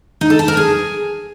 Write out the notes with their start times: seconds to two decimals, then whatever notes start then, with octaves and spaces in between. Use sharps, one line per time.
0.21 D#4
0.30 A4
0.39 A5
0.48 A#4
0.57 G#4